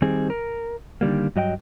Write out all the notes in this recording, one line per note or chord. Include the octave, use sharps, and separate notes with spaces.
D#3 G3 C4 G#4
A#4
D3 D#3 G3 A#3
G2 F#3 D#5 G5